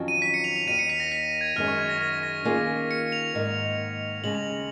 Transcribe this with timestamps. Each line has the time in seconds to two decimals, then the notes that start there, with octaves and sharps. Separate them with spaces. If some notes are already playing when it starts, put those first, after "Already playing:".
Already playing: F2 D#3 F#3 C#4
0.08 D#7
0.22 B6
0.34 C#7
0.44 F7
0.56 F7
0.67 D#2 D#3 A#3 D#7
0.79 C#7
0.90 B6
1.00 A#6
1.06 C#7
1.12 B6
1.41 G#6
1.56 F#2 D#3 G#3 C#4 F6
1.68 C#6
1.79 G#6
1.89 A#6
2.01 A#6
2.23 A#6
2.45 D#3 A#3 C#4 F4 G#4
2.91 C#7
3.12 F7
3.35 G#2 D#3 A#3
4.24 D#2 C#3 G#3 F#7
4.35 F7